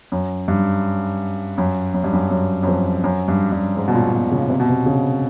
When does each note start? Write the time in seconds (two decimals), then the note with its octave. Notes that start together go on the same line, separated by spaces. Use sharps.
0.12 F#2
0.48 G2
1.58 F#2
1.94 F#2
2.04 G2
2.13 F#2
2.31 F#2
2.63 F#2
2.67 F2
3.04 F#2
3.28 G2
3.52 G2
3.77 G#2
3.88 B2
3.95 A#2
4.13 B2
4.31 C#3
4.50 C3
4.60 B2
4.70 C3
4.86 C#3